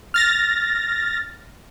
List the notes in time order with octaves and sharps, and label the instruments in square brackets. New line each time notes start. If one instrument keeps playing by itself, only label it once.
[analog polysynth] F6 A6 A#6